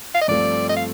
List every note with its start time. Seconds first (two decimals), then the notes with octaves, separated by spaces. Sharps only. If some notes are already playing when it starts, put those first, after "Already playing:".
0.15 F5
0.21 D#5
0.28 G2 F3 A3 C4 D5
0.69 D#5
0.76 F5